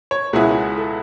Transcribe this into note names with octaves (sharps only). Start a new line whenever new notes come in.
C#5
C#2 B2 G#3 B3 E4 G#4
A4